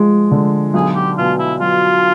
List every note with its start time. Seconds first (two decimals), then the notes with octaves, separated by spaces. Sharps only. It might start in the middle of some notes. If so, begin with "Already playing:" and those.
Already playing: F3 G#3
0.31 D3
0.74 B1 G#4
0.95 G4
1.18 B2 F4
1.39 E4
1.60 F#3 F4